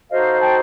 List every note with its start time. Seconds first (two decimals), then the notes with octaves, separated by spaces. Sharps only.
0.10 D#4 F#4 A4 C5 D#5 F5
0.40 G5 A5